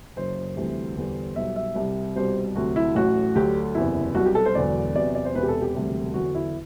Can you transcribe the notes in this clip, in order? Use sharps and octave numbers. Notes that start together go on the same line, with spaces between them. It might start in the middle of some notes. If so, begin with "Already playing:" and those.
F#1 F#2 F#3 C5
D2 C3 E3 G3
E2 D3 G3
B1 B2 G3 E5
E5
C2 C3 G3
C2 B2 G3 C5
D2 C3 F#3 F#4
E4
A1 A2 F#3 F#4
D2 D3 F#3 G4
F#1 E2 C3 E4
C2 B2 F#3 F#4
G4
A4
C5
E1 E2 D3 F#3 D5
E2 C3 F#3 D5
D5
C5
E1 E2 C3 B4
G4
A4
G4
E1 D2 C3 G3
E2 D3 F#3 F#4
E4